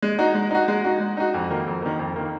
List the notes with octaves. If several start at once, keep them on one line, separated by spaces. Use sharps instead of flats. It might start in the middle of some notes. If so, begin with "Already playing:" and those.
G#3
D#4 F#4
G#3
D#4 F#4
G#3
D#4 F#4
G#3
D#4 F#4
F2
D#3 A#3
F2
D#3 A#3
F2
D#3 A#3